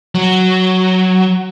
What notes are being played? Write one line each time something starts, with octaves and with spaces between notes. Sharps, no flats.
F#3